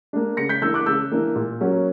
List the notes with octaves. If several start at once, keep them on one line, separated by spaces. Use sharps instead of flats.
A#3 D4
C#3 A#6 C#7
G6 B6
E3 A#3 D4 E6 G6
D6 F#6
C#3 E6 G6
E3 A#3 D4
A#2
F#3 A#3 C#4